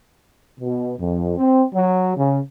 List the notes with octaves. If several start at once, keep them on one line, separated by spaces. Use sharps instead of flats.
B2
F2
C4
F#3
C#3